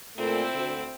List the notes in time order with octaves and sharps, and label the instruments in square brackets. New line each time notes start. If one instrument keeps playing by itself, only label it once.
[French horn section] A#2 A3 [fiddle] C4 E4
[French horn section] D2